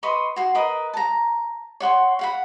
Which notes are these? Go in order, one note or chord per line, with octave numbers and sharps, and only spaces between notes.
B4 D#5 C6 C#6
F#4 C6
A#4 B4 D#5 D#6
A5 A#5
C#5 F#5 C6 C#6
F5 F#5 B5